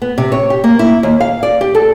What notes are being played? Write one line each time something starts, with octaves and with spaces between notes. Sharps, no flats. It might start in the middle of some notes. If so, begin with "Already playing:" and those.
B3
C3
C#5
G4
A#3
E4
D#2
F5
D5
G4
A4